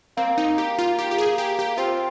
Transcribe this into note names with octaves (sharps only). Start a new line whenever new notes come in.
A#3 C4
D#4
G4
F4
G4
G4
G#4
G4
G4
C4 F4